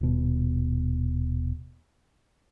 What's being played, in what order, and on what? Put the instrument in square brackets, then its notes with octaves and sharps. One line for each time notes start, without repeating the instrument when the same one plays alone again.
[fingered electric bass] D#1 B2